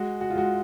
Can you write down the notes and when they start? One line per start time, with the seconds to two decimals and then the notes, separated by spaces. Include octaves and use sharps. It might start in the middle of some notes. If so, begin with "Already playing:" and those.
Already playing: G#3 F#4
0.21 F#4
0.30 F4
0.35 G#3 F#4